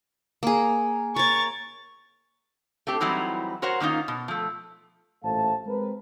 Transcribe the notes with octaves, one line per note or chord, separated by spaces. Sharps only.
A#3 G#4
A#4 C#5 C#6 A6
A3 C4 G4
E3 F#3 G3 C4 D#4 E4
F#4 A#4 C5 C#5 F#5
D#3 A#3 C#4 D#4 F4
B2
F3 A3
A1 A#2 A3 C5 F5 A5
G#3 C4 A#4 B4